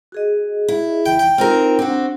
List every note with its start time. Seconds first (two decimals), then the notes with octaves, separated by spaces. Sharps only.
0.12 F#4 G#4 D#5
0.68 E4
1.06 G5
1.19 G5
1.38 C4 D#4 F4 A#4
1.79 C4 D4 F#4